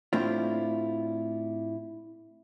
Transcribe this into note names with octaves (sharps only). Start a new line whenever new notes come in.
A2 A3 C4 D4 E4 F4